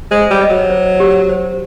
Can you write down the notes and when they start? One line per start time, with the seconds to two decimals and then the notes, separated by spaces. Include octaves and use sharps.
0.11 G#3 C5
0.30 G3
0.41 D#5
0.50 F#3
0.70 C5
1.00 G4
1.29 C5